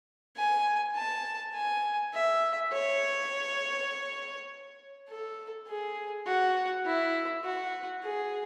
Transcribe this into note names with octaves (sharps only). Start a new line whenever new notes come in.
G#5
A5
G#5
E5
C#5
A4
G#4
F#4
E4
F#4
G#4